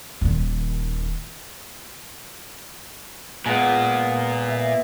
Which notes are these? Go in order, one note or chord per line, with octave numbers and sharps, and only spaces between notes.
D#1 D#3
A#2 G#3 B3
E5